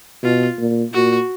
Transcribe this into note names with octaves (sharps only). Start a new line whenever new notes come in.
B2 F4
A#2
A#2 F#4